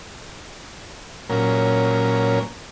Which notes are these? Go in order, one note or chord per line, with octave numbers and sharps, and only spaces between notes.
A#2 F#3 C#4 A#4